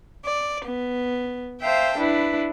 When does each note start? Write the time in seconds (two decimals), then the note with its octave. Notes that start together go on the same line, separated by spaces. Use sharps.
0.25 D5
0.65 B3
1.62 C5 E5 F5 G5 A5
1.97 D4 E4 B4